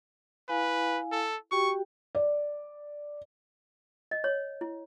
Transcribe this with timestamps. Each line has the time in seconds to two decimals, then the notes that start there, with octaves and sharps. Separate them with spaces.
0.49 E4 B4 F5 G#5
1.12 A4
1.51 F#4 G4 G5 C#6
2.15 D5
4.11 D#5
4.24 C#5
4.61 E4